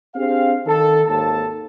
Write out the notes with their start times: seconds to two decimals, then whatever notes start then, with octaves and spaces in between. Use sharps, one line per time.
0.15 C4 D4 G4 G#4 F5
0.66 D#3 A4
1.07 G#1 D#2 A4 A5